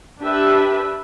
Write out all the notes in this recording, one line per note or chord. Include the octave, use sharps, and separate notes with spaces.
D4 G4 B4 E5